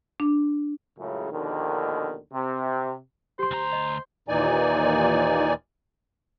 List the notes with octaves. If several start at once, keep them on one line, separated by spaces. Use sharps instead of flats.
D4
C#2 F#2 A2 C#3
A#1 D#2 B2 D3 D#3
C3
G4 C5 C6
D2 A#5
D#5
D#2 A#2 E3 D#4 D5 G#5